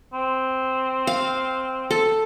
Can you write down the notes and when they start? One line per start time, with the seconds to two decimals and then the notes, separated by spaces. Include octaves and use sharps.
0.13 C4
1.07 F5
1.91 A4